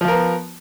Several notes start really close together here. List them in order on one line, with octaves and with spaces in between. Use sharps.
F3 F4 A#4 B3